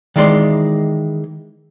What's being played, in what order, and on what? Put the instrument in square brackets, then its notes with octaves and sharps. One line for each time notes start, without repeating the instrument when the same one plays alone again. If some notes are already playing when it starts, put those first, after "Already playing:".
[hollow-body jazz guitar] D#3 E3 G#3 D5 C6